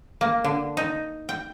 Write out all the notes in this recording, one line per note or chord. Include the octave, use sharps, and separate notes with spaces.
A#3
D3
D#4
G5